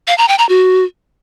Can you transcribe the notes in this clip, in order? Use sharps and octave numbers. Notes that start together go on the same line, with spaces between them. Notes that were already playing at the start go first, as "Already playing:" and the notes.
F5
A#5
G5
A#5
F#4